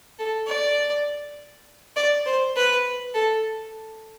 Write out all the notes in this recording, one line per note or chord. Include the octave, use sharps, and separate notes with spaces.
A4
D5
D5
C5
B4
A4